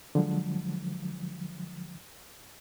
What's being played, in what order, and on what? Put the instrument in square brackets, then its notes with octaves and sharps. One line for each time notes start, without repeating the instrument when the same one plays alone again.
[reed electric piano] D3 F3 F#3 G#3